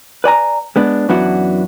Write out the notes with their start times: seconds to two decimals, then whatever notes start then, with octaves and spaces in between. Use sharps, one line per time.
0.24 B4 D5 G#5 A#5
0.76 G#3 B3 D4
1.09 F#2 E3 B3 D4 E4 F#4